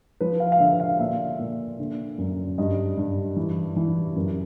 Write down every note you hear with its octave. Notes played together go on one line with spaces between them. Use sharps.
F3 B4
F5
F5
D3 E5
F5
A#2 E5
A#2
D3
F#2
G2 D#5
G2
E3
E3
F#2